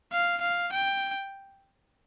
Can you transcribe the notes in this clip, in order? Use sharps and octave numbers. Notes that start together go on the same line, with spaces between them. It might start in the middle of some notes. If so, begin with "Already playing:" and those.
F5
F5
G5